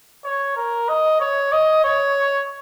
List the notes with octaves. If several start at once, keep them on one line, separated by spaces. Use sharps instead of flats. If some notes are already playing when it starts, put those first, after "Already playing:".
C#5
A#4
D#5
C#5
D#5
C#5